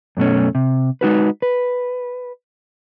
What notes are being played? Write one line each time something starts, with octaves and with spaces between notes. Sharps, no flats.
F#2 B2 A3 C#4
C3
G#3 D#4 F#4 B4
B4